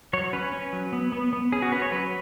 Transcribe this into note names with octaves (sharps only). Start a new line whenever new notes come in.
F#3 C#5
C#4 B4
C#4
F#3
B3
B3
B3
C#4 G#4
F#4
C#4 B4
C#5
F#3 B4